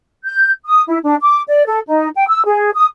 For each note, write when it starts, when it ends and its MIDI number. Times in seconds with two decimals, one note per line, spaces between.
0.24 0.51 91
0.65 0.82 87
0.88 0.98 64
1.04 1.15 62
1.21 1.41 86
1.47 1.63 74
1.66 1.79 69
1.88 2.09 63
2.15 2.25 79
2.28 2.41 88
2.45 2.70 68
2.74 2.86 87